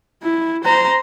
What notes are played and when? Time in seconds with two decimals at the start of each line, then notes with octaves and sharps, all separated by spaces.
0.23 E4
0.64 C5 A#5